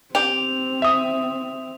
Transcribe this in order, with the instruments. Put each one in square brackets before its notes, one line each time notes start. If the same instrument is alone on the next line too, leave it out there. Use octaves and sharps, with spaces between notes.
[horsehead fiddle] C4 [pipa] G4 [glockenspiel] F7
[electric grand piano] E5 D#6